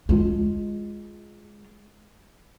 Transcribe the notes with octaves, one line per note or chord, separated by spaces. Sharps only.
G#3 F4